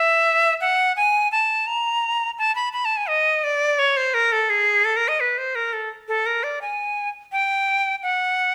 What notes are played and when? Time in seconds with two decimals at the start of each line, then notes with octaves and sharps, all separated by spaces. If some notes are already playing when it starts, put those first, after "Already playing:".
Already playing: E5
0.61 F#5
0.96 G#5
1.32 A5
1.67 A#5
2.38 A5
2.55 B5
2.73 B5
2.85 A5
2.97 G#5
3.09 D#5
3.44 D5
3.79 C#5
3.97 C5
4.14 A#4
4.32 A4
4.50 G#4
4.85 A4
4.96 A#4
5.08 D#5
5.20 B4
5.38 C5
5.55 A#4
5.73 A4
6.08 A4
6.26 A#4
6.43 D5
6.61 G#5
7.32 G5
8.03 F#5